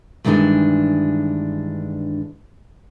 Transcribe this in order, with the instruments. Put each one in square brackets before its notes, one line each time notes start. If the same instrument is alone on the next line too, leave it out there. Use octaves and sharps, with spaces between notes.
[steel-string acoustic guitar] G2 D#3 E3 G#3 D4